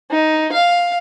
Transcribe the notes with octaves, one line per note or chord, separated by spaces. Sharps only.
D#4
F5